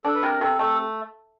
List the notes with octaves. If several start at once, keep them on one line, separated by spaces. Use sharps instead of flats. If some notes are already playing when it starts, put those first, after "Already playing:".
D4 A4
B4
C3 A#4
C3 A4
A3 A4